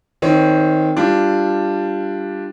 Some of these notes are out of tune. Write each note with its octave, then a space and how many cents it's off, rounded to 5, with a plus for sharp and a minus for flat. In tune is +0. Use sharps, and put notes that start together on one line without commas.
D#3 +10 C4 +0 C#5 +20
G3 +0 D4 +0 F4 -15